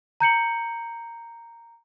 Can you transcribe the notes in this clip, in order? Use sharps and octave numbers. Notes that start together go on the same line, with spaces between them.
A#5 G6 C#7 F#7